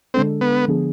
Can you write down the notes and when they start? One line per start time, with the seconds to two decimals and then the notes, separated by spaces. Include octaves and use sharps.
0.14 D3 G#3 C4 D4 A4
0.41 B3
0.68 D3 F3 B3 D4 G#4